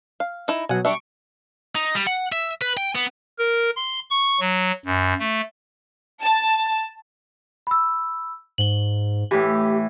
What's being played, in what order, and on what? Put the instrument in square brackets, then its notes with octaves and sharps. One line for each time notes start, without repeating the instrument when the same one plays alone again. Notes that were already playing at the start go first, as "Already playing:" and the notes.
[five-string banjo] F5
D#4 E4
[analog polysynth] B2 F#3 [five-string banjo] F#5 G#5
[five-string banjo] G3 D4 E5 [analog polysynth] C#6 D7
[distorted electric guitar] D#4
G3
F#5
E5
B4
G5
B3
[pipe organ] A#4
C6
C#6
F#3
F#2
A3
[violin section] A5
[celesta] B5 E6
[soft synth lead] G#2 [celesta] F#7 G7
[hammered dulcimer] A2 E3 [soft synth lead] G4